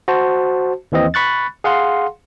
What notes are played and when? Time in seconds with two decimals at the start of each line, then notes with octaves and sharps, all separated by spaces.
0.08 F#4 C5 A5
0.92 D#2 E3 C4 D#5
1.14 B5 C#6 F#6 A6
1.64 G#4 F5 F#5 C6